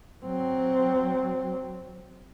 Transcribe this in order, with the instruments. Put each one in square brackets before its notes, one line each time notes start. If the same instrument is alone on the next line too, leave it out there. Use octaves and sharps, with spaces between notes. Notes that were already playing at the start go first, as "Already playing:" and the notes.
[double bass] F#3 C4